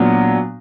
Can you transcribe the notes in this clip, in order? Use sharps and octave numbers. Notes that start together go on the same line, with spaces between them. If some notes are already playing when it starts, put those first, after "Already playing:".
Already playing: A#2 F#3 B3 D4